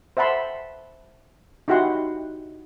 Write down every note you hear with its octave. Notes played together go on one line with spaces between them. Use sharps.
C5 E5 F#5 A5 B5 C6
D#4 E4 F#4 G4 F#5 C6